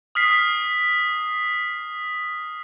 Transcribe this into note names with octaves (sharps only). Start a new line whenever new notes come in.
D#6 F6 B6 C7